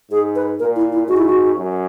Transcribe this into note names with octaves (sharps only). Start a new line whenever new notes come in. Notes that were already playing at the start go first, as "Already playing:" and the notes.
G#2 G#4
B4
A#2 A#4
E4
E4
G#2 F#4
E4
F#4
F#2